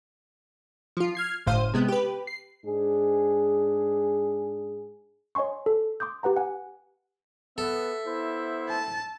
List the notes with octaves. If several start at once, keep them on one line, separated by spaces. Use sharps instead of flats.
F3 F4
F6 G#6 C7
G1 A2 C5 F5 D#7
C3 G#3 B3
G4 B4
C7
G#2 D4 G#4
C#5 D#5 G#5 C6 C#6
A4
C6 D6 D#6 G6
G4 B4 F#5 A#5
F#5 G#5
B3 A4 E5
B3 E4 C5
A5